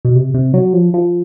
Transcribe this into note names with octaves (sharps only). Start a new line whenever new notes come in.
B2
C3
C3
F#3
F3
F3